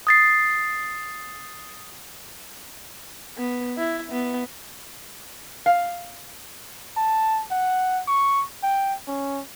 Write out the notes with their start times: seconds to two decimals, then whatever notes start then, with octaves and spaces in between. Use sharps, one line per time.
0.07 D#6 A6 C7
3.38 B3
3.77 E4
4.12 B3
5.66 F5
6.97 A5
7.51 F#5
8.07 C#6
8.63 G5
9.07 C#4